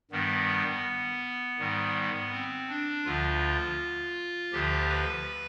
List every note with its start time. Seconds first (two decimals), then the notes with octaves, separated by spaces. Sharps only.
0.11 G2 D#3 G3 B3
1.59 G#2 D#3 G3
2.32 C4
2.69 D4
3.05 D2 D3 F3 F4
4.52 D2 D3 F3 G4
4.89 B4